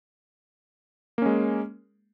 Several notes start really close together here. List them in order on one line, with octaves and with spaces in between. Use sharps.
A#3 C#4 G#3